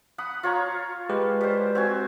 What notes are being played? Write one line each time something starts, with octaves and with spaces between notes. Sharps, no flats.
F#5 B5 D#6
F4 C#5 A#5
G#3 G4 B4
G3 C5
C4 F#4 G#5